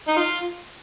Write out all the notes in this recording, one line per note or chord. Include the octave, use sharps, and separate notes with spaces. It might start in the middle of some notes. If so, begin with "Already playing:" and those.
D#4
F4